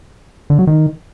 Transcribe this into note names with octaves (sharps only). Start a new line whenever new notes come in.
D3
F#3
D#3